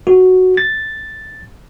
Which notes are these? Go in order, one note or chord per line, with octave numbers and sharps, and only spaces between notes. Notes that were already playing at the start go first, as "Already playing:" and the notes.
F#4
A6